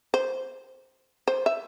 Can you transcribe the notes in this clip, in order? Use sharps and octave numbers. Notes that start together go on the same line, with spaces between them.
C5
C5
E5